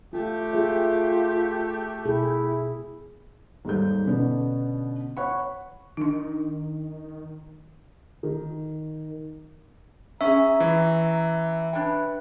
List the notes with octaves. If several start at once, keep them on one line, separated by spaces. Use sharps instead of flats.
A3 F4 G4
F4 G#4 E5
B2 E4 G#4
D#2 G#2 G3 A4 G6
B2 D3 B3 C#4 D4
C#5 F#5 B5 C#6
D#3 D4 D#4
D#3
C#4 G#4 E5 A#5
E3
D4 B4 C#5 G5